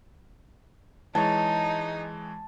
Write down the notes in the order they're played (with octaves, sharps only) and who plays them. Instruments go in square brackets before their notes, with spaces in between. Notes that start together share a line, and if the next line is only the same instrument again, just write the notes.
[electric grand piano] E3 G#3 C#5 [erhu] D#4 [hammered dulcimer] A5